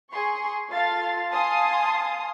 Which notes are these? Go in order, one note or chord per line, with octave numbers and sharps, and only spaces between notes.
G#4 C6 C#6
F4 A4 F5 C6 A6
F5 G#5 A5 C6 D#6